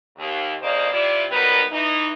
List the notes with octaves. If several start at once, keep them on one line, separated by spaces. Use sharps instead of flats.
D#2
F2 C#3 A#3 C5 D5 D#5
C3 E4 F4 D5
F#3 G3 B3 D#4 A#4 B4
E3 D#4